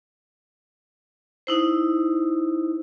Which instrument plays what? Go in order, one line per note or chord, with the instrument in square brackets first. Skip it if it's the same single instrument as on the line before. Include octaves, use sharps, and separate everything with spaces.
[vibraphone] D#4 E4 C5